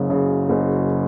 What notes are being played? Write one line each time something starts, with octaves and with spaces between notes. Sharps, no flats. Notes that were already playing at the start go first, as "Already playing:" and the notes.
Already playing: F#1 F#2 C#3
C#3
F#1